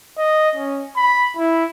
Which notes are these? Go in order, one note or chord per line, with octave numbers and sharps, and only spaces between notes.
D#5
C#4
B5
E4